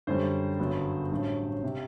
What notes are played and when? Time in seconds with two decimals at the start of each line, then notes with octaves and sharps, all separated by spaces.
0.07 F#2 D3 G3 C5
0.59 G1 F#2 F#3 B3
1.11 A1 G2 F#3
1.64 C3